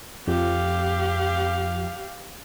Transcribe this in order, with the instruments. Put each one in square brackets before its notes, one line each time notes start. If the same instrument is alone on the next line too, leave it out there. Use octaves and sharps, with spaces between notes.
[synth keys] F2 [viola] G4 F5